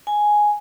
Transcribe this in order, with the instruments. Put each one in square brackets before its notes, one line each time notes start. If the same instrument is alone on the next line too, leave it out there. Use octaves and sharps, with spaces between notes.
[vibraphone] G#5